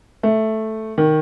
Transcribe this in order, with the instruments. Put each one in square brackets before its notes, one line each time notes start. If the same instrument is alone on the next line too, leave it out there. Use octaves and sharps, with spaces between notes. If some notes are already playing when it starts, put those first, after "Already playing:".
[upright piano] A3
D#3